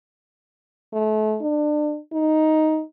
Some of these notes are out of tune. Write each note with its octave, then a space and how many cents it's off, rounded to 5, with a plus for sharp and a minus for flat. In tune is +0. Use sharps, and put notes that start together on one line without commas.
A3 -35
D4 +30
D#4 +5